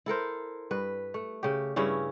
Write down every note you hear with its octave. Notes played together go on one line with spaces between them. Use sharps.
E4 A4 A#4 C5
G2 B4
A3
C#3 G4
G2 C#3 C#4 E4